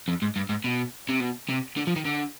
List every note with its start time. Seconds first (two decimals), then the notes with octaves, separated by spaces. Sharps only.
0.08 F2
0.22 G#2
0.36 G2
0.49 G#2
0.64 B2
1.09 C3
1.20 B2
1.49 C3
1.77 D3
1.87 F3
1.96 D#3
2.05 D3